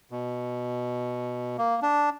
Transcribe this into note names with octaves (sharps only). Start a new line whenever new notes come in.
B2
A#3
D4